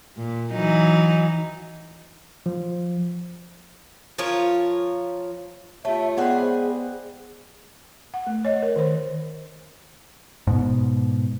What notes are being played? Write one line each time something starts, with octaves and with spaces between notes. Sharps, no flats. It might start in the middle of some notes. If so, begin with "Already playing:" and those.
A#2
E3 F#3 D#4
F3
F3 F4 A#4 C#5
A3 F4 G4 C#5 E5
G#3 B3 G#4 B4 D5 F#5 G5
C5
F#5
A3
C#5 D#5
A#4
D#3 C5
G#2 B2